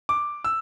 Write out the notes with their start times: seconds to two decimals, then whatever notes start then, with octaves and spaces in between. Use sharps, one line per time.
0.09 D6
0.44 E6